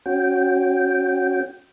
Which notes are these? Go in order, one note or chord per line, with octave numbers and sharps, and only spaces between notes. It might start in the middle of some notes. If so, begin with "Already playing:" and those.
C#4 F#4 G5